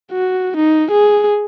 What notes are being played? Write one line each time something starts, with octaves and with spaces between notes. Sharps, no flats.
F#4
D#4
G#4